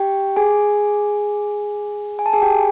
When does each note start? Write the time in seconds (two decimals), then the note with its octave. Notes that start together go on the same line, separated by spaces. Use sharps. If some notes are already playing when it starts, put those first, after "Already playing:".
Already playing: G4 G5
0.36 G#4 G#5
2.19 G#5
2.26 A5
2.33 G#4 G#5
2.42 G4 G5